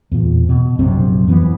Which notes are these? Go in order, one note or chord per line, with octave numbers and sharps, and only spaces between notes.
E2 A#2
B2
A#1 F#2 C3 C4
F2 E3 A#3 B3